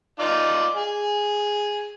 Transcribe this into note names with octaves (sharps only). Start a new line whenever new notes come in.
D#4 F4 D5
G#4